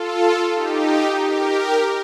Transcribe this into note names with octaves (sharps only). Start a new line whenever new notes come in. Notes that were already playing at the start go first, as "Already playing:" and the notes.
Already playing: F4 A4
D#4 G4
G4 A#4